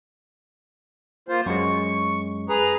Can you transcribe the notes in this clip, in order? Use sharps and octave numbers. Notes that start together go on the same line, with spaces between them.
A#3 F4 C5
F#2 G#3 C#6
G#4 B4 A#5